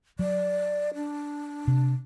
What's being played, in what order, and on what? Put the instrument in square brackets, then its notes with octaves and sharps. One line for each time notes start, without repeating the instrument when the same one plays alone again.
[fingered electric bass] F#3 [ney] D5
[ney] D4
[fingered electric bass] C3